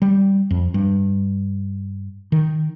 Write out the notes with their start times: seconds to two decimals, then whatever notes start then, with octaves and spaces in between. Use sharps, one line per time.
0.02 G3
0.51 F2
0.74 G2
2.32 D#3